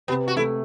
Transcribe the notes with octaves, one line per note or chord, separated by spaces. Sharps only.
C3 B3
F#4
A3 E4